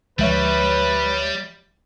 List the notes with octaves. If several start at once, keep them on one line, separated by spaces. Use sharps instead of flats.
D2 F3 G3 G#3 B4 C#5 E5 G6